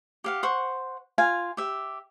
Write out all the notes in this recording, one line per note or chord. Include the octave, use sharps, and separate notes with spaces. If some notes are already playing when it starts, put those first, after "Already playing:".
G4 F5 F#5
C5 F#5 C#6
F4 F5 G#5
G4 E5